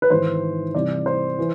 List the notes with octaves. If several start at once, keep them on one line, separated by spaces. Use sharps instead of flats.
B4
G#1 G#2 E3 C5
C2 C3 E3 D5
C5
E3